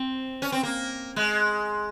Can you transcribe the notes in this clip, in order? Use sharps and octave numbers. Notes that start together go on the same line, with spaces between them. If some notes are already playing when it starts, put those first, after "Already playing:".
Already playing: C4
C#4
C4
A#3
G#3